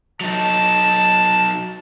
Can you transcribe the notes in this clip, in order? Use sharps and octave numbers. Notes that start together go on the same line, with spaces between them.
F#3 D#4 A5